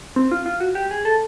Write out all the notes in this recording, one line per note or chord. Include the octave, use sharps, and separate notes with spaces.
C4
F4
F4
F#4
G4
G#4
A4